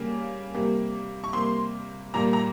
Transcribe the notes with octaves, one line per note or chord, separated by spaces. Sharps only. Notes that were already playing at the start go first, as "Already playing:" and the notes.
Already playing: C#3 G3 A#3
C3 G3 A#3
C#6
C3 G3 A#3 C6
A#2 G3 A#3 A#5
A#5